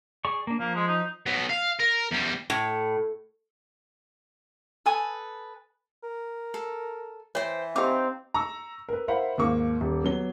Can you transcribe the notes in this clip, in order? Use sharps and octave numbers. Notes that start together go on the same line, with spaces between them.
G#4 D5 C#6
A#3 D4
F3 A#3
G#3
D#4
F#3 B3
F5
A#4
E2 G3
A2
A4 B4 G#5 D#6
A#4
A4
E3 C5 C#5 G5
C4 D#4 G4 F5 D6
A#5 C#6 E6
A#4 B4
E4 A#4 C5 F5 F#5 B5
D#2 G#2 A#3 C#6 D6
D#1
F#3 B3 G7